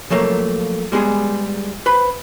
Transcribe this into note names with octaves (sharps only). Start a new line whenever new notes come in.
F3 F#3 A3 A#3
G3 G#3 B3 G#4
B4 C5 B5